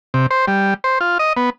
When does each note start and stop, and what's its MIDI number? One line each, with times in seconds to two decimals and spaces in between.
0.14 0.26 48
0.31 0.45 72
0.48 0.74 55
0.84 0.99 72
1.01 1.18 65
1.19 1.33 75
1.37 1.50 59